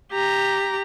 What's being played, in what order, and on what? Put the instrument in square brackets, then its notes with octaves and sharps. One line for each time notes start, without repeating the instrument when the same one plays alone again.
[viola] G4 A#5